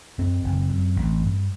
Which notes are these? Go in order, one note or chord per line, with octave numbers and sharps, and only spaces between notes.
F#2 C4
F#1
F#2
A1
G2